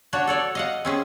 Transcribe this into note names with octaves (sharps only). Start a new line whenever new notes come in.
D4 F#4 C#5
A4 C#5 D5
D#5 F5 F#5
C4 C#4 G#4